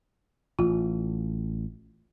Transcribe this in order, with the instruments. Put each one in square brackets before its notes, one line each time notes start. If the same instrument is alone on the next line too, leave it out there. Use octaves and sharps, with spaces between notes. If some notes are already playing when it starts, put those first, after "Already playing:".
[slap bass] A1 [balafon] F4